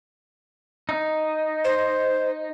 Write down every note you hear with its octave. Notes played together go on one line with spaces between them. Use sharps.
D#4
C5